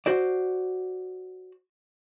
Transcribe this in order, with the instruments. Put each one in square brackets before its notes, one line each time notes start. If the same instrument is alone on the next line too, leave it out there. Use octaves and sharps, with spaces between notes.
[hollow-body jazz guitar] F#4 C5 D5